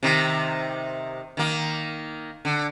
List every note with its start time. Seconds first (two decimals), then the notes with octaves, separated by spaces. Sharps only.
0.03 C3 D#3
1.37 D#3 A#3
2.45 D3